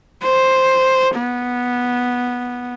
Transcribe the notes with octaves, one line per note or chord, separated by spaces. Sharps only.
C5
B3